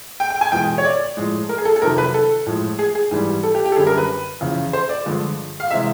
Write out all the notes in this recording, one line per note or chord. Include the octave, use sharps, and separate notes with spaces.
G5
G5
G#5
E2 B2 G#3 G5
C#5
D5
A2 F3 G#3
A#4
G#4
A4
A4
F2 C3 D#3 F#3 A#4
B4
A4
A2 F3 G#3
G#4
G#4
G#2 E3 G3
A4
G4
G4
A4
F#2 D3 G3 G#4
A#4
B4
E2 C#3 F3
C5
D5
G2 D3 F3 G#3
F5
C3 E3 G#3 E5